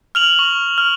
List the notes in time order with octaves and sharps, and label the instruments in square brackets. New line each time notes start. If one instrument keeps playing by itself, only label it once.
[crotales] F6 F7 F#7
C#6
F6